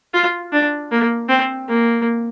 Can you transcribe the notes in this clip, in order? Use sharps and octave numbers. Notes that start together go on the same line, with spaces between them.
F4
D4
A#3
C4
A#3